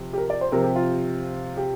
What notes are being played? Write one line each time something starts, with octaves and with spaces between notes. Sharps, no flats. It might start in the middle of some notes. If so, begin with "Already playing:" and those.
Already playing: C3 F3
G4
A#4
D5
C5
C3 F3 C4 A#4
G4
F4
G4